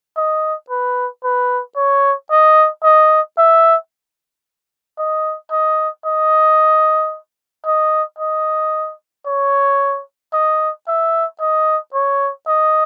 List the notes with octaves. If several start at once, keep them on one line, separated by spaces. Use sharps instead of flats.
D#5
B4
B4
C#5
D#5
D#5
E5
D#5
D#5
D#5
D#5
D#5
C#5
D#5
E5
D#5
C#5
D#5